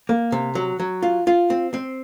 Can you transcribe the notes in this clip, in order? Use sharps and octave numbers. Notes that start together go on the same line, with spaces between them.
A#3
C3
F#3
F#3
F4
F4
C4
C4